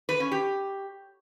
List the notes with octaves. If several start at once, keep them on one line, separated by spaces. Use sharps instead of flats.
B4
C#4
G4